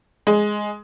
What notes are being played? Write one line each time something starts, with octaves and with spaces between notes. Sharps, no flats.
G#3